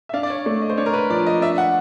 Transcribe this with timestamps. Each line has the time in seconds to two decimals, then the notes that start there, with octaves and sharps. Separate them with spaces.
0.09 E5
0.13 D4 F5
0.23 D5
0.30 C#5
0.46 A3 D5
0.62 D#5
0.70 C5
0.78 D4 C#5
0.86 A#4
0.93 B4
1.10 F3 D5
1.27 D#5
1.42 D4 E5
1.58 F#5